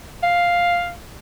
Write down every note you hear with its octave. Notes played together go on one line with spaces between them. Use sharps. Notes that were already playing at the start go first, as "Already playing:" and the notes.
F5